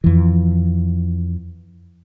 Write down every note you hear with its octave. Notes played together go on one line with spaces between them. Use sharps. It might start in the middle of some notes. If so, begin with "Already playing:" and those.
F2 E3